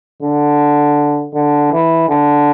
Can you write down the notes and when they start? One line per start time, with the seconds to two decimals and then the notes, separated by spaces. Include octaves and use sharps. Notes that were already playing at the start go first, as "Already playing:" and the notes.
0.22 D3
1.34 D3
1.72 E3
2.09 D3